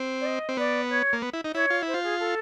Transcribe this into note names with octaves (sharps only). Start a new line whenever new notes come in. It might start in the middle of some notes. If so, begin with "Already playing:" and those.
Already playing: C4
D5
D#5
C4
B3 D5
C#5
A#3
B3
E4
D#4
E4 C#5
F4
E4 C5
F4
G#4
A4